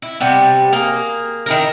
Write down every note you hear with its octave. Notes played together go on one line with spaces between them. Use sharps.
E4
C3 G3 B3
A#3 G#4
D#3 E4 A#4